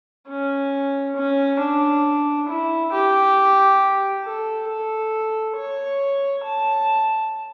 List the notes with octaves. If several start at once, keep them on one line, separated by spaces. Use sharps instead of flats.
C#4
C#4
D4
E4
G4
A4
A4
C#5
A5